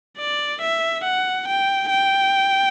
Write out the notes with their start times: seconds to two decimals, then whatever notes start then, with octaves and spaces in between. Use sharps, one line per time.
0.18 D5
0.61 E5
1.04 F#5
1.48 G5
1.90 G5